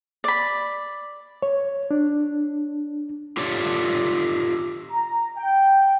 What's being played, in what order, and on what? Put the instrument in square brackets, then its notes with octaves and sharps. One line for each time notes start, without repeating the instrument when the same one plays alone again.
[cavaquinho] D5 B5
[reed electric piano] C#5
D4
[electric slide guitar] F4 G4 A4 C#5 D5
[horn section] A#5
G5